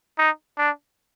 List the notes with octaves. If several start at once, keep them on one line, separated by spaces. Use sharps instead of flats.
D#4
D4